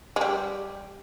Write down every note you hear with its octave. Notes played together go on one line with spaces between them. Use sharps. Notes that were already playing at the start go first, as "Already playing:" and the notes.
G#3
G3